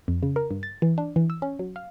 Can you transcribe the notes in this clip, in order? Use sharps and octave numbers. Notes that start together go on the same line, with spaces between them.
F2
C#3
A#4
G2
A6
E3
D4
E3
E6
C#4
F#3
F5